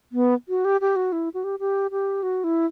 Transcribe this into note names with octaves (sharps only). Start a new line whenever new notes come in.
B3
F#4
G4
G4
F#4
E4
F#4
G4
G4
G4
F#4
E4